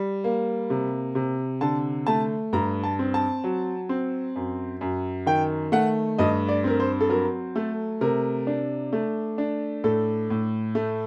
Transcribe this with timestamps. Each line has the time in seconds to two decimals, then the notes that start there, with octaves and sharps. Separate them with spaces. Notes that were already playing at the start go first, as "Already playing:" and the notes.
Already playing: G3
0.24 A#3
0.70 C3
1.15 C3
1.61 D3 A5
2.07 A3 A5
2.53 G2 A#5
2.84 A5
2.99 C4
3.14 A5
3.44 F#3
3.89 C4
4.36 F#2
4.81 F#2
5.26 D#3 G5
5.72 A3 F#5
6.18 G2 D#5
6.49 D5
6.64 C4 A#4
6.80 C5
7.01 A4
7.09 F#3 A#4
7.56 A3 A4
8.01 C3 A#4
8.47 D4
8.93 A3
9.38 D4
9.84 A2 A4
10.30 A2
10.75 A3